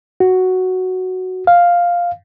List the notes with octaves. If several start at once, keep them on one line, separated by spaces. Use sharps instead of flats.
F#4
F5